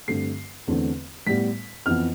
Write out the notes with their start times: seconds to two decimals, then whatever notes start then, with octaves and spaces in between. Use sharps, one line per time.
0.08 G2 D3 A3 C4 C7
0.67 E2 D3 A3 C4
1.26 A2 G3 B3 B6
1.86 F2 E3 B3 F6